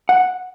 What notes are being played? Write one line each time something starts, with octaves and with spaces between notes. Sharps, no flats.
F#5